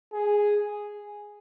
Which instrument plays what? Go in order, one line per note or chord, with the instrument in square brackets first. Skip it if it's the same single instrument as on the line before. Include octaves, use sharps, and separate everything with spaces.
[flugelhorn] G#4